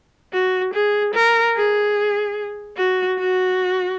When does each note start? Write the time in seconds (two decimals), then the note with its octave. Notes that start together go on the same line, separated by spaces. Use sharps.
0.33 F#4
0.74 G#4
1.14 A#4
1.56 G#4
2.77 F#4
3.19 F#4